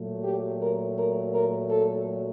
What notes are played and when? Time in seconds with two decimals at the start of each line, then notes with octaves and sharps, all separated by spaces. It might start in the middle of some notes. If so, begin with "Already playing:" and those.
Already playing: A#2 F#3 A3
0.24 G4
0.60 A#4
0.97 A#4
1.33 A#4
1.70 A4